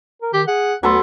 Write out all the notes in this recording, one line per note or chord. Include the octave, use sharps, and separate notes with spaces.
A#4
D#3 G4
G#4 F#5
D2 F#3 B3 A4 C6